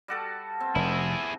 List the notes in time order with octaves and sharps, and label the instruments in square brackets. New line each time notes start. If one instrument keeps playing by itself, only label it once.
[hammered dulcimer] G3 F#4 A4
C4
[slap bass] F1 [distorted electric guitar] E4 G#4